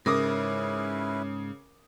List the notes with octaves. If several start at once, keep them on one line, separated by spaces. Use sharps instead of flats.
G#2 C#3 C#4 E4 A#4 B4 D6 D#6